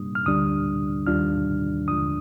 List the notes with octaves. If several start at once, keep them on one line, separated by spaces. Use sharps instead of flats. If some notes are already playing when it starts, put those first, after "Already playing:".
Already playing: C3 G3 A#3 D4 D#6
F6
D2 D3 G3 D4 D#6
D#2 D#3 G3 D4 F4 F6
D#2 D3 F3 G#3 D4 D#6